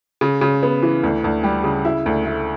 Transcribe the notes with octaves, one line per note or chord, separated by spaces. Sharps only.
C#3
C#3
B3
E3
D2
D2
G3
C#3
E4
D2
A3